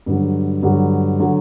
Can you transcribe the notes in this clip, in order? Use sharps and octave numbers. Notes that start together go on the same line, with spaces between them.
G2 D3 F#3
G2 D3 F#3
D3 F#3